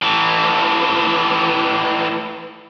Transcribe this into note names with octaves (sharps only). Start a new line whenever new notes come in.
A2 E3